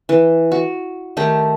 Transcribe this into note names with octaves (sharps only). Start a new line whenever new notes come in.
E3
F#4
D#3 A3 G4 A4